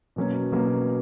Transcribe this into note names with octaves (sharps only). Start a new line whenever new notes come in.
B2 F#3 A#3 C#4
B2 F#3 A#3 C#4